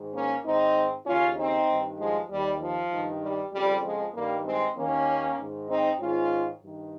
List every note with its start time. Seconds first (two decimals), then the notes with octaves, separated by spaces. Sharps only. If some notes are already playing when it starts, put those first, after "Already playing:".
Already playing: G#2 D#3
0.14 A#3 C#4
0.44 G#2 D#3 C4 D#4
1.06 D#2 C#3 C#4 F4
1.37 C4 D#4
1.68 G2 D#3
1.99 F3 G#3
2.29 D#2 D#3 G3
2.60 F3
2.91 G2 D#3
3.22 G3
3.52 F2 C#3 G3
3.84 F3 G#3
4.14 G2 D#3 G3 A#3
4.45 G#3 C4
4.76 D#2 D#3 A#3 C#4
5.38 G#2 D#3
5.68 C4 D#4
6.00 G#2 D#3 C#4 F4
6.61 G2 D#3